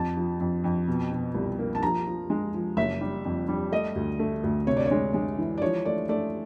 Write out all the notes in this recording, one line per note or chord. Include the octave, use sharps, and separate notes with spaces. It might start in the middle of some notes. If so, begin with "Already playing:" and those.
Already playing: F2 A5
F3
F2
F2
B2
B2
C2
A#3
A5
F3 A#5
F3
G#3
F3
F#1 E5
G3
F2
G3
A3 D#5
D2
A3
D2
C3 C#5
D5
C#5
G#3
G#3
E3
D5
F3 C#5
A3 D5
A3 D5